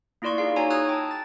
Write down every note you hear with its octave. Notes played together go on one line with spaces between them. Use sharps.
A#3 E4 F4 D5 C6 C#6
D#4 G#4 F5
D#4 F#4 C#5 G#5 A#5
A#5 D#6 E6 F#6 G#6
G5 A5
A6